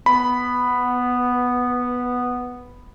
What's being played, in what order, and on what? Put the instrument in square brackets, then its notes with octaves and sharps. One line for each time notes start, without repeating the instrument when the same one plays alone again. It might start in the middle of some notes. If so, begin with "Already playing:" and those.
[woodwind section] B3 [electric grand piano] B5